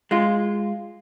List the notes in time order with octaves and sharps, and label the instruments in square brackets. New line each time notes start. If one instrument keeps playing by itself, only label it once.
[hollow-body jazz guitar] G#3 F4